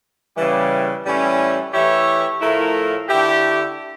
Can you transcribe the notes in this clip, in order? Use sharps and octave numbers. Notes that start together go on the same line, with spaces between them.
C#3 E3 G3
A2 E3 G3 C#4 E4
E3 A3 E4 G4 C#5
A2 F3 A3 E4 A#4
D3 A3 E4 G4